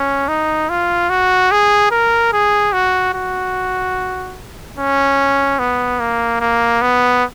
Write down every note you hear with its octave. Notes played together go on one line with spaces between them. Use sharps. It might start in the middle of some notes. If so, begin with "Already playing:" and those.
Already playing: C#4
D#4
F4
F#4
G#4
A#4
G#4
F#4
F#4
C#4
B3
A#3
A#3
B3